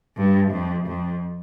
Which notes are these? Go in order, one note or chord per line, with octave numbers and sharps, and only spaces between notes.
G2
F2
F2